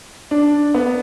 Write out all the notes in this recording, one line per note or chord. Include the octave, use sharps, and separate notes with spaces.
D4
B3